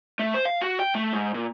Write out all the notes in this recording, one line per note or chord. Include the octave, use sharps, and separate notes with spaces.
A3
C5
F5
F#4
G5
A3
G#2
A#2